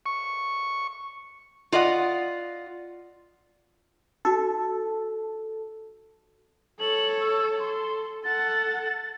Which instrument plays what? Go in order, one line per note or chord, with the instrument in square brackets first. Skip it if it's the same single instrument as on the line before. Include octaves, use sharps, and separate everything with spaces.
[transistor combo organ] C#6
[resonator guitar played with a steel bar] F4 D5 D#5 F#5
[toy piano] D#4 F#4 [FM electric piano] A4
[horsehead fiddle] A4 C#5 [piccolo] F#7
[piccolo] E6
[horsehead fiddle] A4 [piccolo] C6
[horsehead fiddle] A4 F#5 [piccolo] A6